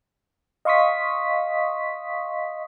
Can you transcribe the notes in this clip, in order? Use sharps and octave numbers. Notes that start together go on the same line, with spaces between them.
D#5 F5 C6 C#6 D#6 B6